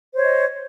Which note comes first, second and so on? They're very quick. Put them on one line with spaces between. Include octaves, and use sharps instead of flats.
C5 C#5 D#5